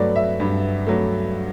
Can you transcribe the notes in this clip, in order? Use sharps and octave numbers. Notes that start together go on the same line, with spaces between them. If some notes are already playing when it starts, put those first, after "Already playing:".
Already playing: G2 F#3 A3 B4 D5
E5
G2
F#3 A3